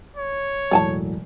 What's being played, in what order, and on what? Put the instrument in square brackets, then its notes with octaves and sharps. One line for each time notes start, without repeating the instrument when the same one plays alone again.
[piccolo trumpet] C#5
[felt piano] E1 A2 F#3 [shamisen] D5 G#5 A5